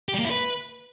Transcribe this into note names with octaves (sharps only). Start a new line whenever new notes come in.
G4
G3
A#3
E4
B4